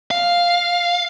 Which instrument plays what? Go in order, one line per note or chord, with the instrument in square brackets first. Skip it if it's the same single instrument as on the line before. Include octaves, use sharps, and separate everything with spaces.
[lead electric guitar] F5